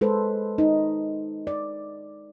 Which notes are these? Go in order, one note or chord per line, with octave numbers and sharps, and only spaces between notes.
G#3 A4 B4 C5
D#4
D5